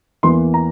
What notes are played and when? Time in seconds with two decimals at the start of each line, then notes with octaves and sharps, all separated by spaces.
0.23 E2 E3 A#3 C6
0.54 A#5